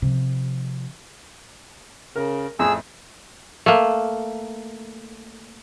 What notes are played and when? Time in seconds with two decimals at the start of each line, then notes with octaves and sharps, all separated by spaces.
0.02 C3 F3
2.16 C#3 A#4
2.59 F2 A2 G#4 E6
3.66 A3 A#3